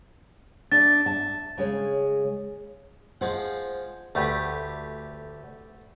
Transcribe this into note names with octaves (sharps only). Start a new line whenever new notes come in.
D4 D5 E5 A6
E5 A5
C#3 G#3 C#5
F3 G#3 C5 F#5
D2 A3 G4 B4